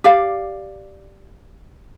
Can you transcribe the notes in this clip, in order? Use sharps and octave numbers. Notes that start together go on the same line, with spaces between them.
G4 D5 F5